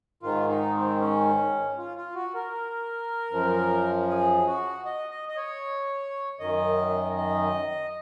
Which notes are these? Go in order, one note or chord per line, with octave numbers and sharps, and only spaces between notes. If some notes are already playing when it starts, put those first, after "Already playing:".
G#2 D#3 F4
D#4
C4
C#4
F4
F4
F#4
A#4
F#2 F3
G#4
F#4
D#5
D#5
D#5
C#5
F#2 D#3 D#5
D#5